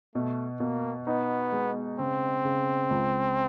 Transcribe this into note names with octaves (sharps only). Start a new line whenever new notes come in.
B2 A3
B2 A#3
B3 D#4
G#3
C#3 C4
C#3
C#2